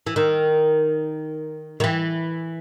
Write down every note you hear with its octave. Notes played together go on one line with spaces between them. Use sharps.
E3
D#3
D#3
E3